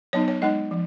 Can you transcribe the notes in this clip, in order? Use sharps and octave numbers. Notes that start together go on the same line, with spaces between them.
F#3 B3 D#4 C#5
C#5
G#3 D#4 D#5
F3